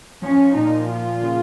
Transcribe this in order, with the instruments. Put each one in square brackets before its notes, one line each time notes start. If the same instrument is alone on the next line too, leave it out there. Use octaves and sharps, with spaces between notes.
[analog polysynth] F3 [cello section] C#4
[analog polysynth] A#2 [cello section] D#4
[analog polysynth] F3 [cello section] F4
[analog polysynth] C#3